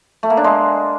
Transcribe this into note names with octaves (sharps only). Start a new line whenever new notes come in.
A3
A#3
D4
G#3